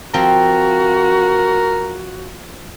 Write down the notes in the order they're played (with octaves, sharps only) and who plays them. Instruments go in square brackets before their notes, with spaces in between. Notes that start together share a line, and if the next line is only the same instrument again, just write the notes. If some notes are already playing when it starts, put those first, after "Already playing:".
[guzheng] F3 C4 [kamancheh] F#4 [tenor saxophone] A#4